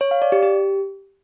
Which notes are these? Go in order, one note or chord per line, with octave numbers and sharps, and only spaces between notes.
C#5
F5
D5
G4
G4